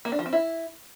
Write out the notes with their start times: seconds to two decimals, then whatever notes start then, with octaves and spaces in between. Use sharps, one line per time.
0.05 A#3
0.12 D4
0.19 F3
0.26 C4
0.33 E4